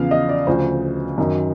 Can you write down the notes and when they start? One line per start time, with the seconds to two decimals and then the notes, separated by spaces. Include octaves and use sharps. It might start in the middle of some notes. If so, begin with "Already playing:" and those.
Already playing: E2 C#3 F3 F5
0.11 D#5
0.29 D5
0.47 D2 C#3 F3 C5
1.18 F#2 D#3